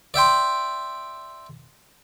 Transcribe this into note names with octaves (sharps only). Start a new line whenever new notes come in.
D5 E5 G5 C6